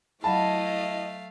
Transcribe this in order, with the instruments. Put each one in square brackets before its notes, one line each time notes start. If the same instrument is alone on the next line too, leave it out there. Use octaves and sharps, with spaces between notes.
[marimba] F#3 B5 [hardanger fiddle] A3 F5 [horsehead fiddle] E4 D#5 [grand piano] A5